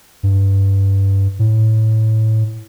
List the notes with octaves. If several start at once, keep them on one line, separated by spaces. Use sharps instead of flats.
G2
A2